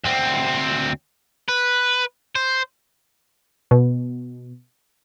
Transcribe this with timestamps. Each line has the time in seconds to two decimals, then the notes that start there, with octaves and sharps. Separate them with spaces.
0.04 D2 C4
1.48 B4
2.35 C5
3.71 B2